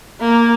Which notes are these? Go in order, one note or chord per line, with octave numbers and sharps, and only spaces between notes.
A#3